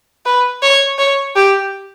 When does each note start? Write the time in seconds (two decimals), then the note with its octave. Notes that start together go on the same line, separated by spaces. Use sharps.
0.26 B4
0.62 C#5
0.99 C#5
1.36 G4